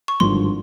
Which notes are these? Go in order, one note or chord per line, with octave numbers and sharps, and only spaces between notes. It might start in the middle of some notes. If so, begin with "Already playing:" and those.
C#6
G#1 G2 D3 F3 C6